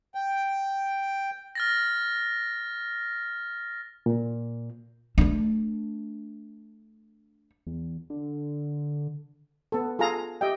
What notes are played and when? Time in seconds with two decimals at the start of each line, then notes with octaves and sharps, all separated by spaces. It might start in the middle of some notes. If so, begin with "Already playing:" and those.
0.15 G5
1.55 F6 A6 A#6
4.06 A#2
5.18 A3 D4
7.66 E2
8.10 D3
9.72 B3 A4
9.99 F4 G#4 A4 F5 A#5
10.41 G4 D#5 E5 G5